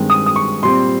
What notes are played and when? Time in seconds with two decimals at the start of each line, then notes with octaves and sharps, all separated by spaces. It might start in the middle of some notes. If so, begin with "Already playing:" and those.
Already playing: G2 D#3 G#3 C4
0.10 D#6
0.26 D#6
0.36 C#6
0.63 A#2 G3 C4 C6